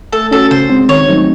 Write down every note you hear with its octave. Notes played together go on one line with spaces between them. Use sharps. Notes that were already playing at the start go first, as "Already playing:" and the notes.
A3 A4
C#4 F#4 A4
C#3 C5
G#3 C4
D#3 C#5
F#3 A3 C4 D#4